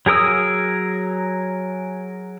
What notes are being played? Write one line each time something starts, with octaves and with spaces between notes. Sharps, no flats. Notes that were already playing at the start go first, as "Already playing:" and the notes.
F#3 G#4 A#4 D#6 E6